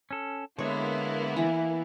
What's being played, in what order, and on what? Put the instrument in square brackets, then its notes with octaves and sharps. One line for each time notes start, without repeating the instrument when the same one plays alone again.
[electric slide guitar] C#4 A4
[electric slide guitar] D3 G#3 [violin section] A#3 B3 E4 [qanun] C#5
[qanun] E3